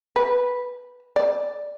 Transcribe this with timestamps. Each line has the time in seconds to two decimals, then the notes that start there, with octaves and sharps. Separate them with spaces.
0.16 B4
1.16 D5